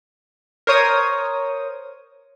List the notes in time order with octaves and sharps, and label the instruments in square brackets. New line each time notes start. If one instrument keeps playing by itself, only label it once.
[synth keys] A#4 C5 C#5 D#6